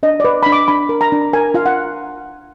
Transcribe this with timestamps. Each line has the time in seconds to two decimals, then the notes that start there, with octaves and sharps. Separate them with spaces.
0.03 D4 D#5
0.20 B4 D5
0.43 D4 B5
0.52 D6
0.68 D4 B5
0.89 A#4
1.01 A#5
1.12 D4
1.33 A#4 G#5
1.54 F4 F5
1.66 F#5